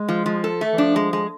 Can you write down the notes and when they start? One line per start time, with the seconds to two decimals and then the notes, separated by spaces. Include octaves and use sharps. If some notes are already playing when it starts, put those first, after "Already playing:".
Already playing: G#3
0.08 F3
0.26 F3
0.44 A4
0.61 A3
0.73 E3
0.78 F3 D4
0.96 G#3
1.13 G#3